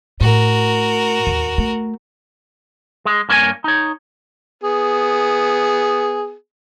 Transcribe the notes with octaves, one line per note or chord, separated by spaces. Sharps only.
A2 F#4 A#4
D#2
A3
G#3
G2 A#3 C#4 F#4 C#5 G#5
D#4 C#5
B3 G#4